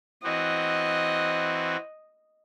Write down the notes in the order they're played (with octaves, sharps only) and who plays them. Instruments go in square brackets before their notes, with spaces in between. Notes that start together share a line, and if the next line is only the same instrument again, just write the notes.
[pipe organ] E3 C4 F#4 [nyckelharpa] D#5